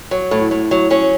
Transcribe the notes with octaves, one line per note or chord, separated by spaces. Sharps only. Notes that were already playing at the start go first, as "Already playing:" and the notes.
F#3
A2
A2
F#3
F#3 C#4